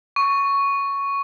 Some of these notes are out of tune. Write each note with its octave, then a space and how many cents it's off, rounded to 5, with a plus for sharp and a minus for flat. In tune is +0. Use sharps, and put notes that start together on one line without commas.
C#6 +5